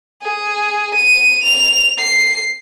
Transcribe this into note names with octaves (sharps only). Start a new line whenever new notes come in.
G#4
D#7
F7
C7